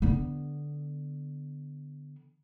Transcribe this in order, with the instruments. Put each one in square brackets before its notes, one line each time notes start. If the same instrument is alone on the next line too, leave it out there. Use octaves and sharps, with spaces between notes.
[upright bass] D3 B3